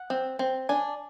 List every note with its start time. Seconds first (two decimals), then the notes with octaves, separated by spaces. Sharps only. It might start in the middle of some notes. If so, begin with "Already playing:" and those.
Already playing: F#5
0.10 C4
0.39 C4
0.69 D4 G#5